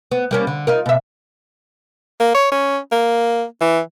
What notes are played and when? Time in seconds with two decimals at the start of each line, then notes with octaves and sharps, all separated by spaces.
0.11 B3
0.31 G3 A#3 C#4
0.47 D3
0.67 D#4 F4 A#4
0.86 B2 E5
2.20 A#3
2.34 C#5
2.52 C#4
2.92 A#3
3.61 E3